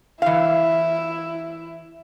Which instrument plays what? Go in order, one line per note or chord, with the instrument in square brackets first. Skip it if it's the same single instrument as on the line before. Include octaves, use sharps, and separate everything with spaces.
[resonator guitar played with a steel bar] E3 F5 [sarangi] E4